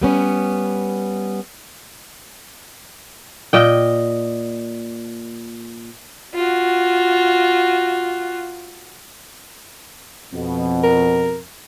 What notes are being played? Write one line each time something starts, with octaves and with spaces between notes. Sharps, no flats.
G3 B3 C#4
A#2 D#5 G5
F4 F#4
F2 B2
A#4